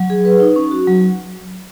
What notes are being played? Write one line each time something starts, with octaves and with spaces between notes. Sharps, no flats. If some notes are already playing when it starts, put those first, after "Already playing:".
Already playing: F#3
G#4
B4
D#4
C#4
F#4
F#3